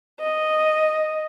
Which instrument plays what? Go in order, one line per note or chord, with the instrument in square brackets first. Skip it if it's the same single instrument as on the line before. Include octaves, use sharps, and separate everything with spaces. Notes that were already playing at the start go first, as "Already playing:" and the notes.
[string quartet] D#5